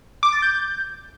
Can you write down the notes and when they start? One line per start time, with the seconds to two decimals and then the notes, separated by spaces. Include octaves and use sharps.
0.23 D6
0.33 A6
0.42 G6